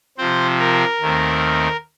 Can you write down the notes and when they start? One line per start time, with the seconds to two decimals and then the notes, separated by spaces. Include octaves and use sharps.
0.18 C3 F3 C4 C5
0.59 A#4
1.01 D#2 D#3 A3 C4